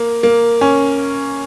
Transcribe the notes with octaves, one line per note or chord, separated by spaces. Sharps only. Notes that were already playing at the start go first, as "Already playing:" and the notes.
Already playing: A#3
A#3
C#4